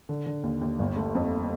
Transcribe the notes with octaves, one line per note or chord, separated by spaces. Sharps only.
D3
D3
D#2
D#2
G1
A3
F2